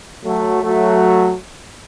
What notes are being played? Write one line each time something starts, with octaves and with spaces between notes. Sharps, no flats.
F#3 A3
F#3 A3